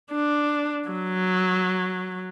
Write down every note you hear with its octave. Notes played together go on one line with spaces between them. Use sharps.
D4
F#3